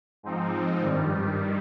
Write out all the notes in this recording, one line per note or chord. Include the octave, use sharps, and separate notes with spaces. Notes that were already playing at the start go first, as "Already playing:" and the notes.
G#2 F3 C4 D#4
G2 D#3 G3